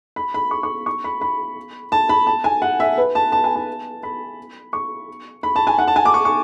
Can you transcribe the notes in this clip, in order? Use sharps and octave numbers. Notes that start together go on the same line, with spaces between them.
B5
B5
C#6
C#6
C#6
B5
B5
A5
B5
A5
G#5
F#5
E5
B4
A5
A5
G#5
A5
B5
C#6
B5
A5
G#5
F#5
A5
G#5
D6
C#6
C#6